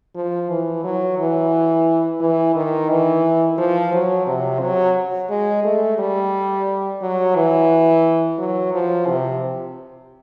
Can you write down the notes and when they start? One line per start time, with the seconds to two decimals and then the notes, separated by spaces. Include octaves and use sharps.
0.15 F3
0.49 E3
0.84 F#3
1.19 E3
2.20 E3
2.55 D#3
2.90 E3
3.58 F3
3.93 F#3
4.27 C3
4.61 F#3
5.30 G#3
5.64 A3
5.98 G3
7.02 F#3
7.36 E3
8.38 F#3
8.73 F3
9.08 C3